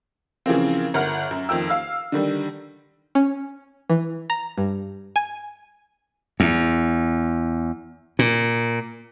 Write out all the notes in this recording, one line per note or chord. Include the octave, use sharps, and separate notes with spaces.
C#3 E3 F3 A#3 C4
G1 A#4 F#5 F6
F#2
F2 D#3 G5 E6
F5 E6
D3 D#3 G3
C#4
E3
A#5
G2
G#5
E2
A#2